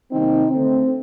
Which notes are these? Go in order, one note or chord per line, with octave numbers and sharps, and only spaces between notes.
C3 D#3 G3 A#3 C4 D#4
D3 A3 C4